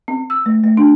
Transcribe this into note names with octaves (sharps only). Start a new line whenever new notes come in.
C4
E6
A3
A3
D4